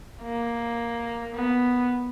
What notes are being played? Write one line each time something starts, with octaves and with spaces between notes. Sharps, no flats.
A#3
B3